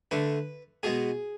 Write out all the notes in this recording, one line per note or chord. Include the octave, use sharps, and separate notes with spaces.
D3 A3 B4
B2 G#3 B3 G#4